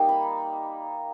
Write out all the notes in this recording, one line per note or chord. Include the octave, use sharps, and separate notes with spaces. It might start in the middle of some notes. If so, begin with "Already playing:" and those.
Already playing: G3 A#3 D#4
B5